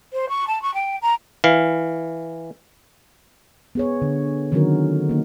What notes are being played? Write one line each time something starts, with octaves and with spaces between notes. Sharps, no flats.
C5
C#6
A5
C#6
G5
A#5
E3 F5
B3 G#4 C#5
D3
D3 D#3 F#3 C#4 F#4 A#4
A#3 D#4